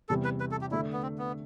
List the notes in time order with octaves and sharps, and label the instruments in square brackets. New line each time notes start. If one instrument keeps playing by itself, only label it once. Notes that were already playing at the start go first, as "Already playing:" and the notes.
[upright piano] E2 C3 G3 [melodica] A4
[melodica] B4
B4
A4
G4
[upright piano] D3 A3 D4 [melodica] E4
[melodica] B3
C4
B3